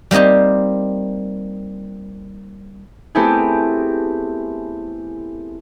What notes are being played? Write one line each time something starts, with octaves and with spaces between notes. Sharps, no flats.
G3 A#3 C4 D#4 G4
A3 B3 C4 E4 G4 G#4